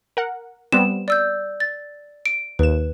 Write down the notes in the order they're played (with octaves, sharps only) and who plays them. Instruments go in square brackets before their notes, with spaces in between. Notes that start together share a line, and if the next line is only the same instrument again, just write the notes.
[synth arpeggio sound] A#4 F#5
[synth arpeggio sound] G3 B3 C4 [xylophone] E7
[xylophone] D5 E6 G6
A6
D7
[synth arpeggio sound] D#2 E7 [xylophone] B4